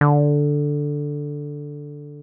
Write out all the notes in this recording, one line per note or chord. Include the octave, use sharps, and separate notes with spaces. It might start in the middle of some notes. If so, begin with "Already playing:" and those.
D3